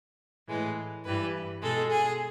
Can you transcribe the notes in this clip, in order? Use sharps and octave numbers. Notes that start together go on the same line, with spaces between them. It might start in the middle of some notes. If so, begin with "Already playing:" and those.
A2 E3 G#3
G2 E3 G3 B4
B2 G#3 A4
G#4